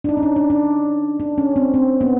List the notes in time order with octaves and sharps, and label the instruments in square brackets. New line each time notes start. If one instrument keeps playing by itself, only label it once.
[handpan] D4
D#4
C#4
D4
D4
D4
D4
C#4
C4
C4
B3